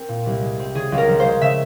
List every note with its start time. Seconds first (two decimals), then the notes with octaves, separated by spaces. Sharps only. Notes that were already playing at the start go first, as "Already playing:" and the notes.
Already playing: C4 A#4
0.09 A#2
0.26 C2
0.42 G#3
0.59 C4
0.75 C#3 G#4
0.92 C#2
0.98 A#4
1.09 F3
1.20 C5
1.25 G#3
1.41 C#3 E5